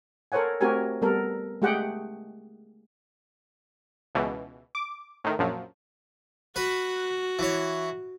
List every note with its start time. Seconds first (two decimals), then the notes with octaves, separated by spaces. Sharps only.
0.32 A4 A#4 C5 C#5 F#5 G#5
0.61 A3 C4 F#4 G4 A#4 G#5
1.02 G3 B3 A4 A#4
1.62 G#3 A3 G4 G#4 F#5 G5
4.15 C#2 B2 E3
4.75 D6
5.24 A2 D#3
5.39 A#1 F#2 F3 F#3
6.56 F#4 B4
7.39 E3 C#5